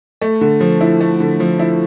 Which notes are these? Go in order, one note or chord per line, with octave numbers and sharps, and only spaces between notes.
A3
D3
F3
E4
A3
D3
F3
E4